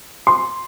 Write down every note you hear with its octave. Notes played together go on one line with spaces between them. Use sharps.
C6